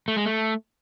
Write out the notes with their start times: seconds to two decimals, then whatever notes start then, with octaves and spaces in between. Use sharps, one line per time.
0.08 A3
0.17 G#3
0.25 A3